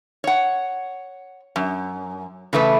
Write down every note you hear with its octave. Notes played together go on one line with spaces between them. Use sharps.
C#5 F#5
F#2
C#3 E3 A3 B4